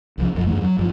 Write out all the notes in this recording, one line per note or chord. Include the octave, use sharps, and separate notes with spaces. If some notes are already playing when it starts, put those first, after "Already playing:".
C2 F3
E1 A1 F2
E2 G2 E3 A3
F#3
G#1 G2 D3 F3